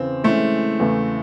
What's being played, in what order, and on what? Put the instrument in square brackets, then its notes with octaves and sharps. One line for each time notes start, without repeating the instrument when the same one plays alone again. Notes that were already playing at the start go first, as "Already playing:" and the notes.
Already playing: [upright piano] E2 C#3 [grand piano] C4
[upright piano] E3 G#3 C#4 [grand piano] A3
[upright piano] E2 C#3 E3 A3